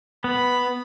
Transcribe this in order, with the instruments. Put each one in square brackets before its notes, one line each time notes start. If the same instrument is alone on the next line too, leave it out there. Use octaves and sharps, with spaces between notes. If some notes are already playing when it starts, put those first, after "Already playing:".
[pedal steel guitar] B3 [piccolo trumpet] B5